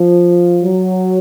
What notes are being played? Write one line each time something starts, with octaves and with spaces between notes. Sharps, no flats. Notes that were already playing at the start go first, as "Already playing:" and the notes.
Already playing: F3
F#3